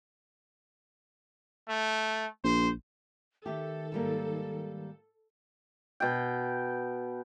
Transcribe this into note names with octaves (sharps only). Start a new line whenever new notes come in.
A3
A#1 C5
D#3 A3 G4 A4
G#2 G3 A#3
B2 G5